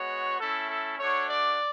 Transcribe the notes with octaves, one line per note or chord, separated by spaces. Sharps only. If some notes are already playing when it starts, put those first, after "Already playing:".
Already playing: G#3 B3 F#4 C#5
A3 C#4 E4 A4
A4
A3 D4 F#4 C#5
D5